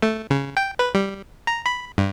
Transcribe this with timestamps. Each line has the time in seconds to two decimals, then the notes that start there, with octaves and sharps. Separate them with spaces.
0.02 A3
0.30 C#3
0.57 G5
0.79 B4
0.95 G3
1.47 A#5
1.66 B5
1.98 G2